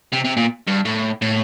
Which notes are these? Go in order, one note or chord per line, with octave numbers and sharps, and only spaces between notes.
C3
C3
A#2
G2
A2
A2